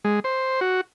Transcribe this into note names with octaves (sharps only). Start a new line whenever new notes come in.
G#3
C5
F#4